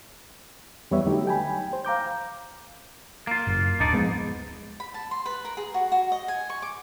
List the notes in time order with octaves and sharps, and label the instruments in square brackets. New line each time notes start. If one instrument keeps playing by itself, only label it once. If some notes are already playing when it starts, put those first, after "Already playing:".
[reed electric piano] E2 G3 B3 B4 C#5 E5
D3 F#3 A3 D#4 G4
G5 G#5 B5
C5
F5 A#5 D6 G6
[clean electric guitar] A#3 F4
[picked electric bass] F#1
[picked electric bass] D1 [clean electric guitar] D4 D#4 D5
[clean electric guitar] G#2 [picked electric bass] F3 G#3 B3
[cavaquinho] B5
A5
C6
B4
A#4
G#4
F#4
F#4
D#5
G#5
C#6
D6